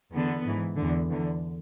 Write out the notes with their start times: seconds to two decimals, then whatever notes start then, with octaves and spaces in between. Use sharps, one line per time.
0.13 E2 D3 B3
0.45 G#2 E3
0.77 E2 D3
1.09 E2 D3